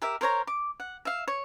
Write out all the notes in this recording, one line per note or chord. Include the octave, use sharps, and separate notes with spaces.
G4 A#4 E5
A#4 C5 C#5 A#5
D6
F#5
E5 F5
C#5